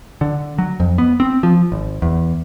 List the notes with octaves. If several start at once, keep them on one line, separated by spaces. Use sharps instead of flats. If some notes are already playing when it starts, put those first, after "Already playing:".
D3
F#3
F2
B3
C4
F3
G#1
E2